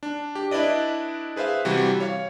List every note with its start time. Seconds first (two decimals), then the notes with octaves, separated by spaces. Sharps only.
0.03 D4
0.35 G4
0.51 D4 E4 B4 D5 D#5
1.36 G#4 B4 C5 E5 F5
1.65 C3 E3 G3 F#4 B4
2.00 C#5 F5